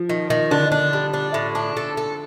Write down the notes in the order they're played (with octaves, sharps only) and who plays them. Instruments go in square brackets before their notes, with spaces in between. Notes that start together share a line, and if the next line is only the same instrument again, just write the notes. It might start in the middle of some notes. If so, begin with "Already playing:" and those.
Already playing: [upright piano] F3
[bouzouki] D#3
D#3
[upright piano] D3 [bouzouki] D4
[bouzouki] D4
G3
D4
A2
D4
A4
A4